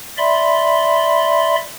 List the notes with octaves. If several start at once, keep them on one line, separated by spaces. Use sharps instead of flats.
D5 E5 B5 C6